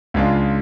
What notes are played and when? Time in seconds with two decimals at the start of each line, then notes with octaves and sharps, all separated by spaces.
0.14 C#2 C#3 G#3 D4 F4